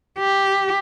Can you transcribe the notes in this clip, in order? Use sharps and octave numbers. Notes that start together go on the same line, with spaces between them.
G4